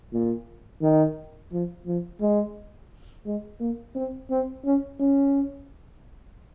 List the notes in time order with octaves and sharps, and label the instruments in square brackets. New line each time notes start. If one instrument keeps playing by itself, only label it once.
[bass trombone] A#2
D#3
F3
F3
G#3
G#3
A#3
C4
C4
C#4
C#4